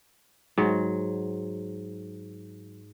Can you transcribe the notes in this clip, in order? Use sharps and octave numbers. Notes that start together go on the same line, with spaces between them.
G#2 F#3